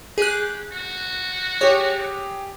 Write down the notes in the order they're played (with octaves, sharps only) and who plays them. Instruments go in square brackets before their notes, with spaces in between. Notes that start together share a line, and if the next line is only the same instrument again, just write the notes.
[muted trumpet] G4 [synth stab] G#4 F#6
[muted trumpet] F#4
[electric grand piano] G4 G#4 [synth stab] C#5